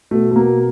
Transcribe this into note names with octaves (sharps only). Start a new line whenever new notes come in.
B2 A3
A3
B2 A#3